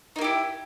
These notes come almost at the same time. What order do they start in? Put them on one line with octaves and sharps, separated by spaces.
D#4 A#3 G4 E4